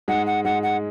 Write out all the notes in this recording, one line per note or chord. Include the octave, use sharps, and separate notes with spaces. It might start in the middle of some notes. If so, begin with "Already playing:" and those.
G#2 G#3 F#5
F#5
G#2 G#3 F#5
F#5